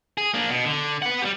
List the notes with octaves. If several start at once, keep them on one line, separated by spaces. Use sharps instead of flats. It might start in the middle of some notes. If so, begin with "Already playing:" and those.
G#4
A#3 D4
B2
D3
B4 F#5
G3 G4